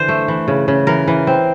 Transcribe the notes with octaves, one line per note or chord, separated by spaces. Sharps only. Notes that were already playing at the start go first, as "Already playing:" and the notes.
Already playing: D3 E3 C5
A3
E3
C#3
C#3
E3 A#4
E3
C4